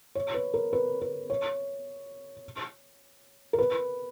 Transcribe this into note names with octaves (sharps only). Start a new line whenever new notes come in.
C#5
B4
A#4
B4
B4
C#5
A#4
B4